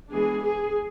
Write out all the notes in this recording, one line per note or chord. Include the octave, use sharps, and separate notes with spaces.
E3 G#3 B3 D4 G#4
G#4